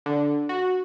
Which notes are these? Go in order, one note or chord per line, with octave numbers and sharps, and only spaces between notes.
D3
F#4